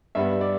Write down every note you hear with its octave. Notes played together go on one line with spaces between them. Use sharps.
G2 G3 B3 E5
D5